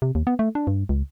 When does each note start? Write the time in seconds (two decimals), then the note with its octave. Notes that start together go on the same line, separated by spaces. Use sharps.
0.02 C3
0.15 D#2
0.27 B3
0.39 A3
0.55 D4
0.67 G2
0.89 C#2